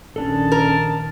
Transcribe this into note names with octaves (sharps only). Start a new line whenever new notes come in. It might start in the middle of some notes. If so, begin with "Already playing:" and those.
A#1 D#3 C#4 D4 A4 A5
A#4